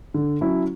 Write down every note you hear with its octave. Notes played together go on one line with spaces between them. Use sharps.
D3
F#3 C#4 E4